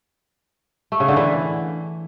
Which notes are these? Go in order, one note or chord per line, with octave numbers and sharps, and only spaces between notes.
A3
C#3
D3
E3